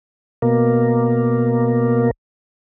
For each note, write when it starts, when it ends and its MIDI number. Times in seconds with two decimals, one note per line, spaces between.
0.42 2.11 47
0.42 2.11 58